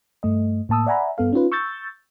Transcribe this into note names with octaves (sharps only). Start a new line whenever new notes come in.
G2 A3 D#5
A2 A#3 A5 D#6 E6
D5 E5 F#5 G#5 A#5 B5
G2 B3 A4 F5
C#4 D#4 F4 B4
C#6 E6 G6 A6